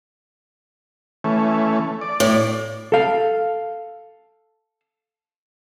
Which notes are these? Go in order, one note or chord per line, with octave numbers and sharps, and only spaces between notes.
E3 A3 C#4
D5
A2
A4 F5